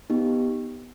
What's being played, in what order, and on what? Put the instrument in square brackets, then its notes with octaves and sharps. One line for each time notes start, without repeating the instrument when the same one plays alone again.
[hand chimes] B3 D#4 G4